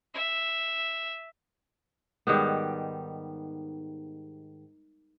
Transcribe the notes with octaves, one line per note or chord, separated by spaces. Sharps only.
E5
G#2 D#3 G3 B3